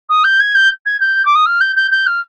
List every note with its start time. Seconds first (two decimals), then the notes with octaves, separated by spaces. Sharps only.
0.09 D#6
0.24 G6
0.39 G#6
0.55 G6
0.85 G#6
1.00 G6
1.25 D6
1.35 D#6
1.46 F6
1.60 G6
1.76 G6
1.91 G6
2.06 F6